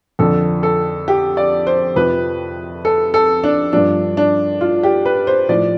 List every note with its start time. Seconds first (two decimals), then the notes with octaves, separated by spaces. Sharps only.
0.19 F2 D3 F3 A4
0.63 A4
1.08 G4
1.37 D5
1.67 C5
1.96 F2 C3 F3 B4
2.85 A4
3.14 A4
3.44 D4
3.73 G2 F3 D4
4.17 D4
4.61 F4
4.83 G4
5.06 B4
5.27 C5
5.49 A2 F3 D5